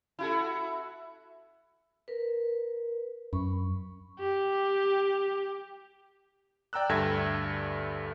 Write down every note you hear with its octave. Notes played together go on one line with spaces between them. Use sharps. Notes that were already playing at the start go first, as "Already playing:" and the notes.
E4 F#4 A4
A#4 B4
F#2 B5 C#6
G4
D5 G5 A#5 E6 F#6
D2 G2 A4 E5 G#6 A#6